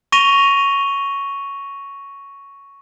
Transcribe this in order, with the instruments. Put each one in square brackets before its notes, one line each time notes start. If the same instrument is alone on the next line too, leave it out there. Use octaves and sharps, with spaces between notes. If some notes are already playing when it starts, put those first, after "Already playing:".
[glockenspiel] C#6 A#6 D#7 F7 G7